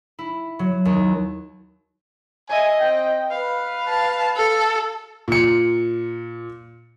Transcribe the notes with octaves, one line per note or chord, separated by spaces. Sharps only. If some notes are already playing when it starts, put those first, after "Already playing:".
E4
F#3
D#2
D#5 E5 G#5
C4 G5
B4 F5
A5
A4
A#2 C#7